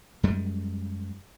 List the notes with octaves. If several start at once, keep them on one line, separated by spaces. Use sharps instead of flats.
F#2 G3 G#3